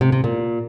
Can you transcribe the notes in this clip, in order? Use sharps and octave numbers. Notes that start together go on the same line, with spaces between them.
C3
C3
A#2